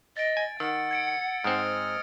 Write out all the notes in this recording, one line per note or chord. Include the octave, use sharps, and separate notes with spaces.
D#5 A6 D7
G#5
D#3 F#5 E6
G#6 C#7 D7
G#2 C4 D#5 F6